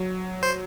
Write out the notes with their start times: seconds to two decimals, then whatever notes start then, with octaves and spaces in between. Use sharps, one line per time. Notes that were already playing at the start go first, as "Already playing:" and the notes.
Already playing: F#3
0.43 C5